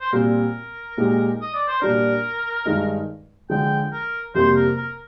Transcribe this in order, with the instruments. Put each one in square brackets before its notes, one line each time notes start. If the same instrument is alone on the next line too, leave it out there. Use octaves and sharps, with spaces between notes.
[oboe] C5
[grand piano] A#2 G3 C4 [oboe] A#4
[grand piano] A#2 G#3 D#4 G4
[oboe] D#5
D5
C5
[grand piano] A#2 G3 D4 [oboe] A#4
[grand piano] G2 D#3 G#3 D#4
[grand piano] D3 F3 G#3 [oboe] G5
[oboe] A#4
[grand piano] F2 C3 G3 A#3 [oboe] C5
[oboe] A#4
A#4